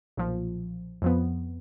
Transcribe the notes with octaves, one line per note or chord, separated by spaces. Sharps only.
B1 A#2 F3
F2 F3 B3